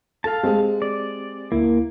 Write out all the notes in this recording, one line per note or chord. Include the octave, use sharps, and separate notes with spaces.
A4 F5 A5
G#3 C4 G4 G#4
D5
D2 A#3 E4